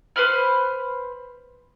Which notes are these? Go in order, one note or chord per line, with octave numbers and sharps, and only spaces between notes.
B4 C5 B5 F6